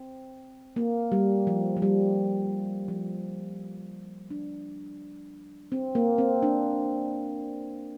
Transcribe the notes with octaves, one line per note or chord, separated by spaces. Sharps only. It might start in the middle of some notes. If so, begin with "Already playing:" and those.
Already playing: C4
A#3
G3
F3
F3
G3
F3
D4
C4
A#3
C4
D4